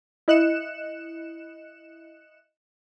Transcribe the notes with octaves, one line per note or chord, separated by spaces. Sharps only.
E4 D#5 F#6 C#7 E7